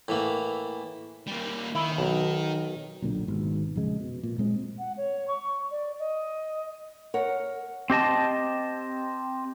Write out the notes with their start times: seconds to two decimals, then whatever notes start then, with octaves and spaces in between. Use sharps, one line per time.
0.08 A2 E3 A#3
1.27 G3 A#3
1.75 D#3 E4
1.98 B1
3.02 B1 A#2 D3
3.28 G#1 G#2 B2
3.76 A#1 F2 C#3 G#3
4.00 B2
4.23 A#2
4.38 A#2 G#3 C4
4.78 F#5
4.97 C#5
5.27 C#6
5.71 D5
5.99 D#5
7.14 A#4 C#5 F#5
7.90 C4 G4 D#5 A5